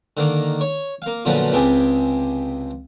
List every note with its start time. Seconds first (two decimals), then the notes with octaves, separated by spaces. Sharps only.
0.17 D3 D#3 A#3
0.61 C#5
1.02 A#3 F5
1.25 F#2 A#2 D3 F3 B3
1.52 C#2 C3 G4 G#4 A5